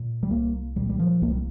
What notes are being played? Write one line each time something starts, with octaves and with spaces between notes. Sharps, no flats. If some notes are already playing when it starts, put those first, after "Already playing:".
Already playing: A#2
G3
C2 A#3
A#2 G3
G3
F3
C2 A#3
G3